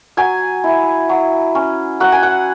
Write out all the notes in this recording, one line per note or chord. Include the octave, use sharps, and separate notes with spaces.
F#3 G#5
E4
F#3
C#4
F#3 F#5
G#5
F#5